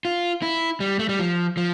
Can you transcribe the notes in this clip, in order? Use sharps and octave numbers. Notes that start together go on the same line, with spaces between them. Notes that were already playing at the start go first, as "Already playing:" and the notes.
F4
E4
G3
A3
G3
F3
F3